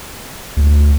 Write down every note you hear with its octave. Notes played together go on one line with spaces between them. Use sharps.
D2